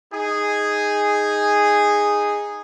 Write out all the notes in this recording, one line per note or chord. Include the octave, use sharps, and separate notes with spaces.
D#4 G#4